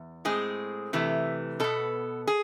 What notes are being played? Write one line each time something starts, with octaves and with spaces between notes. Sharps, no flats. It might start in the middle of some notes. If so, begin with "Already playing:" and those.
Already playing: E2
A2 G#3 C4 G#4
C3 E3 A3
B2 B3 A4
G#4